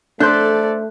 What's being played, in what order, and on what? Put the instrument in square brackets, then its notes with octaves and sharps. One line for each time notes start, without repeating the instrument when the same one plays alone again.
[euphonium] A3 [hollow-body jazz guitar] D4 C5 [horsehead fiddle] A4 D5 [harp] F#6 G6 B6